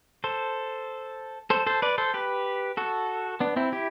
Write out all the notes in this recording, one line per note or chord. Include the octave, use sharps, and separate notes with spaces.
A4 C5
A4 C5
A4 C5
B4 D5
A4 C5
G4 B4
F#4 A4
B3 D4
C4 E4
E4 G4